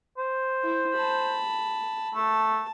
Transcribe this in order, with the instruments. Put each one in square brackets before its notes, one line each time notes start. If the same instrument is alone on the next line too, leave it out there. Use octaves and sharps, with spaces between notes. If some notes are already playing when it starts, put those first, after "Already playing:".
[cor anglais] C5
[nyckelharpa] E4
A5 B5
[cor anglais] A3 [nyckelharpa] A5